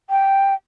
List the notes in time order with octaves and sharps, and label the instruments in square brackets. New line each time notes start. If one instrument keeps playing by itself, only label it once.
[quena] G5